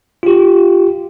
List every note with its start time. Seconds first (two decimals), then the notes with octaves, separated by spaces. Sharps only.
0.23 F4 G4